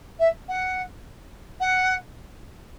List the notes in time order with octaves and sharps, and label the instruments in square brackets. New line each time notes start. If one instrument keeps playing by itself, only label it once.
[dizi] E5
F#5
F#5